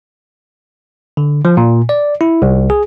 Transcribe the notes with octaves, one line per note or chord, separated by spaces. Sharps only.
D3
F3
A#2
D5
E4
C2
G#4